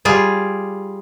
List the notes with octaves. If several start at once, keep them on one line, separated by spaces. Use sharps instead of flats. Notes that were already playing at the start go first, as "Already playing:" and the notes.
G3 F4 G#4